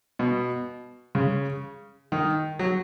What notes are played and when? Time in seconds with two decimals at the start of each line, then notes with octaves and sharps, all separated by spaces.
0.19 B2
1.15 C#3
2.12 D#3
2.59 F#3